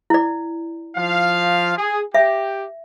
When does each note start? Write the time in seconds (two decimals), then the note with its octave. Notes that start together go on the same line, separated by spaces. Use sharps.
0.10 E4 D5
0.96 F3 F5
1.77 G#4
2.14 G4 E5